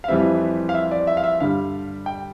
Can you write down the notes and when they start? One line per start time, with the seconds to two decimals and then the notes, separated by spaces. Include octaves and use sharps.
0.04 F5
0.08 F2 E3 G3 C4 E5
0.69 F5
0.74 E5
0.91 D5
1.07 E5
1.17 F5
1.24 E5
1.40 G2 D3 G3 F5
2.06 G5